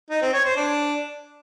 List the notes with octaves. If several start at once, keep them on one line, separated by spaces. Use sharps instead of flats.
D#4
C4
C#5
C5
D4